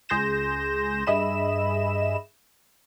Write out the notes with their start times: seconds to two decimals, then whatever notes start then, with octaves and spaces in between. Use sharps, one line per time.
0.09 C#2 G#4 C6 G6 A#6 E7
1.07 G2 G#4 D#5 E5 B5 E7